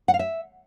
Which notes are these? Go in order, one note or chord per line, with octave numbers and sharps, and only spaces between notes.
F#5
F5
E5